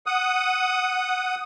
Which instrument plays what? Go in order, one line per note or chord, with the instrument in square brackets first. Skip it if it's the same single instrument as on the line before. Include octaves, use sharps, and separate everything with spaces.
[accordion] F#5 D#6